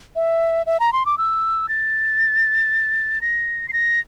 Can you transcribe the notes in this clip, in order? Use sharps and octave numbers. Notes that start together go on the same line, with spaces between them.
E5
E5
A#5
C6
D6
E6
A6
A#6
C7
A#6